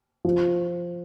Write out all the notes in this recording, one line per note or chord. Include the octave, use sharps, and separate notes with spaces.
F3